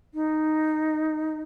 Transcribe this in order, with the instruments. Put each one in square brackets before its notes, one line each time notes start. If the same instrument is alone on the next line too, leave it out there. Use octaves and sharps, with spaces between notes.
[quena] D#4